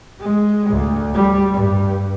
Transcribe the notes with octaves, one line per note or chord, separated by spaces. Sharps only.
G#3
D2
G3
G2